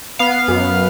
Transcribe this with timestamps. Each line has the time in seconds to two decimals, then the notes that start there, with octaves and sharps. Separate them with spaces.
0.19 B3 F5
0.48 F#2